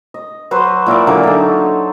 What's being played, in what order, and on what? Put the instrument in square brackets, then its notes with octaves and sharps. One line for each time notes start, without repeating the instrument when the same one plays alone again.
[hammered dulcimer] D#5
F#3 B4 C5 C6
A#2 E4 A#4 D5
D3 E3 F#3 A#3
D#4 A4